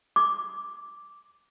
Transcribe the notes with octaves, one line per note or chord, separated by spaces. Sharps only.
D6